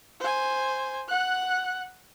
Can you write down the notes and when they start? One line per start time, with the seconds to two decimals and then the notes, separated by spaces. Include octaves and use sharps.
0.20 C5 G#5
1.08 F#5 F#6